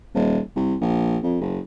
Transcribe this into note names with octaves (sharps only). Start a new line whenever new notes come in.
D#1
C2
A#1
F2
F#1